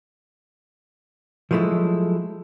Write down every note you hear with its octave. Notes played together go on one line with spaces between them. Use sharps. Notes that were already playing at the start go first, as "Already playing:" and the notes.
F3 F#3 G#3 A3 E4